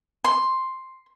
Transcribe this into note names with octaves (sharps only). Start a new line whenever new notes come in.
C6